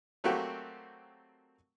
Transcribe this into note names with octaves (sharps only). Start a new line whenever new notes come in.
F#3 A3 A#3 C4 F#4 G4